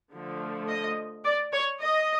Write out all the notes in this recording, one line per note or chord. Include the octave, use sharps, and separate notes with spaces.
D3 F3 A3
D#5
D5
C#5
D#5